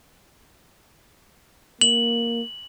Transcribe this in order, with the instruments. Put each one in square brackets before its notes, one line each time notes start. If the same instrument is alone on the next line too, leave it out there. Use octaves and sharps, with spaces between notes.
[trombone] A#3 [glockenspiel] F#7